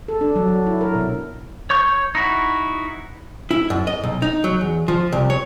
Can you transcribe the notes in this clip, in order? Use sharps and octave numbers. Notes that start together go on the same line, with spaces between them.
A4
D4
F#3
F#3
E4
A#4
B2
C#5 C#6 G6
D#4 E4 F#4
E4
F#2
D#5
B1
D#4
F#3
E2
F3
C2
C#5